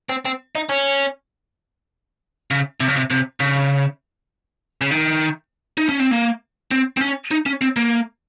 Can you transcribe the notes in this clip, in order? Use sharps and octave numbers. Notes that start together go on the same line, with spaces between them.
C4
C4
D#4
C#4
C#3
C3
C#3
C3
C3
C#3
C#3
D#3
D#4
C#4
C4
A#3
C4
C4
C#4
D#4
C#4
C4
A#3